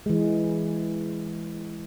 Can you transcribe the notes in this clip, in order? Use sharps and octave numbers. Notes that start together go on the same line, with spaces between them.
E3 G#3